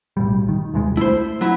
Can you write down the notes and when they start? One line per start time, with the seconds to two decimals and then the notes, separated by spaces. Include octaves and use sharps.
0.17 B1 A2 G3
0.49 D#3
0.74 D#1 C2 G#3
0.97 A3 E4 C5
1.41 F#3 E4